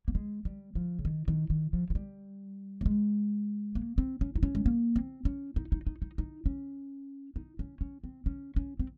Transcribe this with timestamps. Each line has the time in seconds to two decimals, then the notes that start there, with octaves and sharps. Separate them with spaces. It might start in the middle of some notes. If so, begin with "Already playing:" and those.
0.08 A#3
0.15 G#3
0.45 G3
0.75 F3
0.99 C#3
1.05 D#3
1.28 D#3
1.50 D#3
1.73 F3
1.90 F3
1.95 G3
2.81 A#3
2.86 G#3
3.75 A#3
3.98 C4
4.21 C#4
4.35 D#4
4.43 C#4
4.55 G#3
4.66 A#3
4.96 C4
5.25 C#4
5.56 D#4
5.72 D#4
5.87 D#4
6.02 D#4
6.18 D#4
6.46 C#4
7.36 D#4
7.59 C#4
7.81 C#4
8.04 C4
8.26 C#4
8.56 C#4
8.79 C4